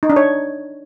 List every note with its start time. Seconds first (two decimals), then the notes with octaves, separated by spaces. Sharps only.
0.03 D#4
0.10 D4
0.16 C#5